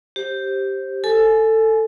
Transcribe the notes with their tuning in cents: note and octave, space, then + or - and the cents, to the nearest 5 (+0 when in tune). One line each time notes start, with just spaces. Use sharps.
G4 -5 C5 +20
A4 +15 G#5 +30